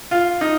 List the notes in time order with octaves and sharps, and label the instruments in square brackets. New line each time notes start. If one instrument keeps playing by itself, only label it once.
[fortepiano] F4
D#4